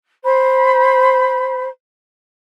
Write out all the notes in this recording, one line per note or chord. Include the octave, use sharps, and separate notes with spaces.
C5 B5